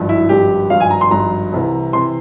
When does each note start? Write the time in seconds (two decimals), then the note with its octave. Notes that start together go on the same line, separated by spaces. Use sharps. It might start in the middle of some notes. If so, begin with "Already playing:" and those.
Already playing: G#1 G2 F3
0.09 E4
0.29 G#1 G2 F3 G4
0.70 G#1 G2 F3 F5
0.80 G#5
0.91 A#5
1.01 C6
1.11 G#1 G2 F3 A#5
1.52 C2 C3 E3
1.93 C3 E3 C6